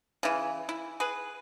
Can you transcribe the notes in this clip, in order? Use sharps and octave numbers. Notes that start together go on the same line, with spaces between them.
C#3 E3
E4
G#4 B4